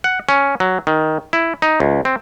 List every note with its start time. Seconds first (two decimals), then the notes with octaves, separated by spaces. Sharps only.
0.04 F#5
0.29 C#4
0.60 F#3
0.87 D#3
1.33 E4
1.62 D#4
1.80 C#2
2.05 C4